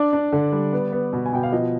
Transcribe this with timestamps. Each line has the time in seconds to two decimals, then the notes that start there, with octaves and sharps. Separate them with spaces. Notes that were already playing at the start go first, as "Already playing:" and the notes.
Already playing: D4 D5
0.13 D4
0.33 D3
0.52 G3
0.73 B3
0.92 B3
1.13 B2
1.26 G#5
1.33 B2 G5
1.43 F5
1.52 F3 D#5